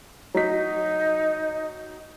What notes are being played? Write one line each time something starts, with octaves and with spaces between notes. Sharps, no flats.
F#3 D#4 B6